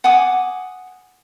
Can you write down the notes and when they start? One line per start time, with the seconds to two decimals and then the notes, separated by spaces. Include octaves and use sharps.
0.04 F#5 G#5 D6 D#6